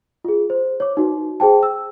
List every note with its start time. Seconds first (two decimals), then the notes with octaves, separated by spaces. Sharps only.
0.24 F4 G#4
0.50 C5
0.80 C#5 D6
0.97 D#4 F#4 B4
1.40 G#4 C5 G5 A5
1.63 E6